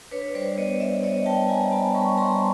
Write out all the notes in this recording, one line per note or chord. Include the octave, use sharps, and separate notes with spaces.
D4 B4 C#5
G3 C5 D5
B3 C#5 D#5
G3 D5 E5
B3 C#5 D#5
G3 G5 A5
G3 G#5 A#5
B3 A5 B5
G3 B5 C#6
G3 A#5 C6